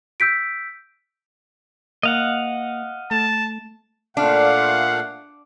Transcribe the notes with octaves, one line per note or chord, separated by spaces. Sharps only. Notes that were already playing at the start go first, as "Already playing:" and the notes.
E6 G6 B6 D7
A#3 D#5 F5 F#5
A3 A5
A#2 A3 D4 F5 F#5